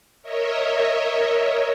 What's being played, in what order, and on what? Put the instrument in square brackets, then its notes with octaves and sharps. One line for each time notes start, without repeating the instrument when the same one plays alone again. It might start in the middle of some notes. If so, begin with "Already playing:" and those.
[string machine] A#4 C#5 D#5 E5